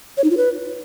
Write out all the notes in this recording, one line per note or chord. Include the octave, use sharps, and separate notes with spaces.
C#5
D#4
F4
B4